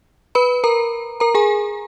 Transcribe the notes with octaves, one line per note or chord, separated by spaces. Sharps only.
B4 B5
A#4 A#5
A#4 A#5
G#4 G#5